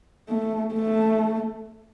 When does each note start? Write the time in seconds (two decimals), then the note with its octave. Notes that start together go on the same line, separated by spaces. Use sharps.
0.29 A3
0.74 A3